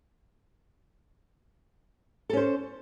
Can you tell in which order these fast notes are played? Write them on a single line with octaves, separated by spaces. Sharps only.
A4 C#4 C5